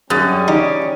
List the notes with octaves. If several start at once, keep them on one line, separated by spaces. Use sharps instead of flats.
F#2 G3 C#4 G#4 D#6 A6
D#4 G4